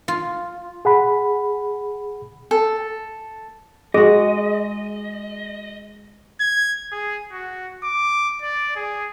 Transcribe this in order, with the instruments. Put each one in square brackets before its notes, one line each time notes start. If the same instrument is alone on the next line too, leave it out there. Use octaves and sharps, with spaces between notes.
[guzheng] F4
[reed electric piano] G#4 F#5 B5
[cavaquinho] A4
[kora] G#3 F#4 [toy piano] G#4 [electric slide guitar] D#5
[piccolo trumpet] G#6
G#4
F#4
D6
D5
G#4